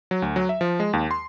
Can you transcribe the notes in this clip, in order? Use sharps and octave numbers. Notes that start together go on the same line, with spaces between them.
F#3
D2
F#3
E5
F3
G#3
D#2
C6